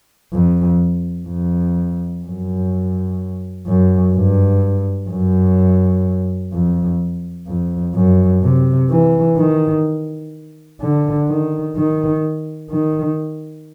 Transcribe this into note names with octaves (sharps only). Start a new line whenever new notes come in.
F2
F2
F#2
F#2
G2
F#2
F2
F2
F#2
C3
E3
D#3
D3
D#3
D#3
D#3